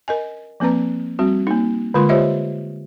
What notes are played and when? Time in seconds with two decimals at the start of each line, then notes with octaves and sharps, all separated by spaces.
0.08 A#4 D#5 G#5
0.60 F3 A#3 C4 B4 A#5
1.19 G3 C4 F#4
1.47 A#3 D#4
1.94 D3 G#3 F4 A#4 C6
2.09 F4 G4 C5 C#5 D#5 E5